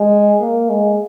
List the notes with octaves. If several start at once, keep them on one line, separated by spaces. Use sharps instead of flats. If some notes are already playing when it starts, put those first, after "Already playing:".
Already playing: G#3
A#3
G#3